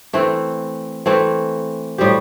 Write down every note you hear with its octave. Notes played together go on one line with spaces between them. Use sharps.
E3 A3 C4
E3 A3 C4
A2 G3 C4 G4